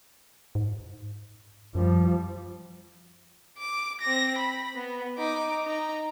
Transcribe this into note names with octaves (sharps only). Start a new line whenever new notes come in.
G#2
F#2 F3 G3
D6
C4 A#6
B5
B3
D#4 D6
D#4 A#5